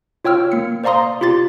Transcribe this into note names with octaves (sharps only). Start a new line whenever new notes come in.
F4 C#5 G5 E6 F6
A#3 C#7
C5 D5 F5 A#5 C6 D#6
F4 G4 C6 A6